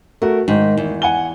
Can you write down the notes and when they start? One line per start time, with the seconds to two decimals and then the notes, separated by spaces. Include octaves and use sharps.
0.22 A3 F#4 A#4
0.48 G#2 D#3
0.77 E2
1.02 F#5 G#5 G7